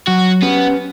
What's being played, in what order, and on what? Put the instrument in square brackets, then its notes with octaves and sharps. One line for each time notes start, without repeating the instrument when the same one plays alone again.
[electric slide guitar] F#3 [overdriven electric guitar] F#4
[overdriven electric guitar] B3 [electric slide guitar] C#4 G4 B4